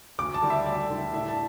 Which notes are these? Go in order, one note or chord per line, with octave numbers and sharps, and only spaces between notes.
D2 D6
A5
D3 G3
E5
D2 D5
D3 G3
A2 E5
A5